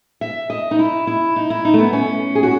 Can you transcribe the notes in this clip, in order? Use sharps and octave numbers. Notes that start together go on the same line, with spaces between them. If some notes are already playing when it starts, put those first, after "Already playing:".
E5
D#5
D#4
E4
E4
D#4
E4
D#4
A3
B3
C#4
G#4
F#4